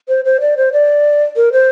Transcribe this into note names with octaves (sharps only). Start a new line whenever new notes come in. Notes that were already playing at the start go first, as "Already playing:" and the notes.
C5
C5
D5
C5
D5
A#4
C5